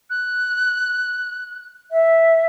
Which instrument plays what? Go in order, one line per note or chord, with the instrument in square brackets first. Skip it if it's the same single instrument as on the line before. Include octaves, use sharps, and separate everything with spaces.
[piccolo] F#6
[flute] E5